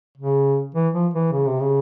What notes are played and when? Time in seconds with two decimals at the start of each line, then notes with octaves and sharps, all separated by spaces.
0.18 C#3
0.75 E3
0.94 F3
1.14 E3
1.32 C#3
1.47 C3
1.60 C#3